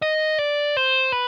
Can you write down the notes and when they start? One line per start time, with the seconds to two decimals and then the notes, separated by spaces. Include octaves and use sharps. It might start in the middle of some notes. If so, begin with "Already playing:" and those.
0.02 D#5
0.39 D5
0.77 C5
1.12 B4